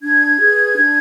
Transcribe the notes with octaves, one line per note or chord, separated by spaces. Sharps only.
D4 G#6
G#4 B4
D4